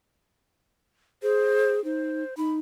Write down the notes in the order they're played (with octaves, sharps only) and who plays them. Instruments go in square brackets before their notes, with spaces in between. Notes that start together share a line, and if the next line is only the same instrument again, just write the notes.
[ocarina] G#4 [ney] C5
[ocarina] D#4 [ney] C5
[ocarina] D#4 [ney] B5